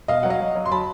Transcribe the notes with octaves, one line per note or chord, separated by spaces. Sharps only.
B2 D#5 F5
F#3 F#5
D#5 F5
F#3
F#3
C6
F#3 A5 B5